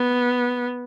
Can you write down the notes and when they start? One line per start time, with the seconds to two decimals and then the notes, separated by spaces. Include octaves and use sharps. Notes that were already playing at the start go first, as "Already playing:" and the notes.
Already playing: B3